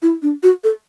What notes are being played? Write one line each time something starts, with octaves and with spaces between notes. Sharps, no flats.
E4
D4
F#4
A4